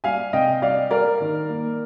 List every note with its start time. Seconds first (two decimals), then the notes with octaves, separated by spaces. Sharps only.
0.04 G3 F5 G#5
0.33 C3 D#5 G5
0.62 G3 D5 F5
0.90 G3 A#4 D5
1.21 D#3
1.49 A#3